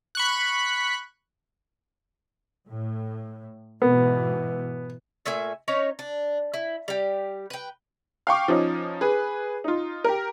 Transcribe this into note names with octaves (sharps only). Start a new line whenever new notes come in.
B5 C#6 F#6
A2
G#2 B2 E3 B3
A#2 A3 E5 G#5
C#4 D#4 C#5
D4
E4
G3 G4
B4 G5
F5 G5 C#6 D6
F3 C#4 D#4
G#4 B4
D#4 F4
G4 A#4